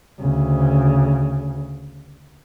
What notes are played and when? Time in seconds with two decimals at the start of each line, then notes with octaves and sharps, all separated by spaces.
0.20 D2 C#3